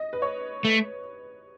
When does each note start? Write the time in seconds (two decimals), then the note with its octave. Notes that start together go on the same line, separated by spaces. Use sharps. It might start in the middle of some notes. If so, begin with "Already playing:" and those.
Already playing: D#5
0.13 B4
0.22 C#5
0.65 A3